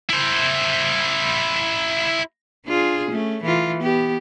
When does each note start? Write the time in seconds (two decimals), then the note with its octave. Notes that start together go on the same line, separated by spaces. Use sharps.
0.09 E4 C5
2.66 D4 F4 G#4
3.11 A3 C#4
3.44 E3 A3 F4
3.79 B3 G4